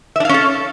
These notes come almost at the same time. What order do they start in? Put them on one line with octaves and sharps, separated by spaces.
E5 D4 F5 C#4 A4